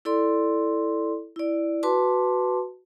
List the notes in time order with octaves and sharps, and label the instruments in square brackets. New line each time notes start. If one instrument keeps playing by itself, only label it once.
[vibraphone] E4 A4 D5 C6
E4 D5
F#4 B4 A5 C6 D6